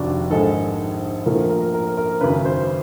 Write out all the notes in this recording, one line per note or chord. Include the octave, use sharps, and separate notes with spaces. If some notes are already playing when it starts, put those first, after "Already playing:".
Already playing: F1 D#2 D3 D4 F#4
A#1 G#2 D#3 G#3 A4
A#1 A#2 F3 A3 A#4
A#4
A#4
A#4
G#1 F#2 C#3 B4
C5